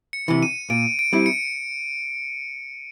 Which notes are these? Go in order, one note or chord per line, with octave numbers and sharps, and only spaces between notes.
C#7
C3 E3
D#7
A#2 D7
D7
G3 C4 E4
C#7